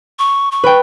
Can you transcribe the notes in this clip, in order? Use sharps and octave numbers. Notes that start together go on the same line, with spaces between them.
C#6
C#6
B4 G5